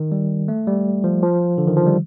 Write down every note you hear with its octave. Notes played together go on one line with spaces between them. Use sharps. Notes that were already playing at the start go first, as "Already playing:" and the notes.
Already playing: D#3
G3
A3
G3
F3
F3
D3
D#3
F3
G3